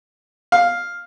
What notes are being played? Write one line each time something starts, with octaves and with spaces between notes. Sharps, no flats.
F5